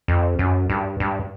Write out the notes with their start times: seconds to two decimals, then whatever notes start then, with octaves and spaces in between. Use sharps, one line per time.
0.08 F2
0.39 F#2
0.70 G2
1.00 G2